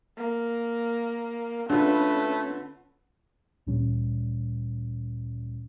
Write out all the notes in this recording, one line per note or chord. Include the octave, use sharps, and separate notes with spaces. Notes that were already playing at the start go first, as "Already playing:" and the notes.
A#3
D3 A3 C#4 F4 B4
D2 A#2 E3 G3 C#4